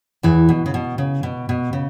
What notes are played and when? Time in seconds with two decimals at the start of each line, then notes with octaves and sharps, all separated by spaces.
0.23 E2 E3
0.49 B2
0.66 C#3
0.74 B2
0.98 C#3
1.23 B2
1.49 B2
1.73 C#3